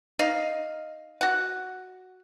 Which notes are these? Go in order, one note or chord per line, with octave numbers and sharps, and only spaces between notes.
D#4 D#5 F5
F#4 F#5